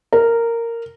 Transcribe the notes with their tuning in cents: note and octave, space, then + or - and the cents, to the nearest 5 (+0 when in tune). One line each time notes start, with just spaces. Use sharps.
A#4 -10